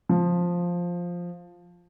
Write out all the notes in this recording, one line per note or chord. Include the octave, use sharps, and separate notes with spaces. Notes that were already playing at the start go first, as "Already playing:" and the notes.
F3